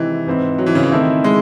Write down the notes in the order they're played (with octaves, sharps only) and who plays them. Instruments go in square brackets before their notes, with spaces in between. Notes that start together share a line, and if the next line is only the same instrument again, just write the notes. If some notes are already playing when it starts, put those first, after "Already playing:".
Already playing: [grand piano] C3 D#3 G#3 C4 [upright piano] E3
[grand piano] G#2 E3 C4 E4
[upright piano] F#3
E3
C#3
E3
[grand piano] D#3 A3 C4 E4
[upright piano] G#3